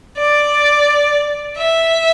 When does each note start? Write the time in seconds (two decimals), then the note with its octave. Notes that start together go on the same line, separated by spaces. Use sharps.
0.18 D5
1.58 E5